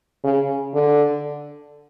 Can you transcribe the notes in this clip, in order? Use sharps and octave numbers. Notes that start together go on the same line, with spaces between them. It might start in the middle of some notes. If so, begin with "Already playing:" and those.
C#3
D3